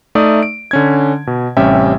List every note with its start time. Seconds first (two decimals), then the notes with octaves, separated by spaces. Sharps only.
0.15 A3 D#4 D5 E5 D#6
0.43 D7
0.71 D3 C#4 G#6
1.27 B2
1.57 A1 C3 G3 C#4 E5 G5